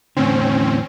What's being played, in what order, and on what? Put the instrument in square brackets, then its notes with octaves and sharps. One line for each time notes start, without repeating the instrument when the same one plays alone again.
[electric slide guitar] E2 A2 D3 [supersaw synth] C4 C#4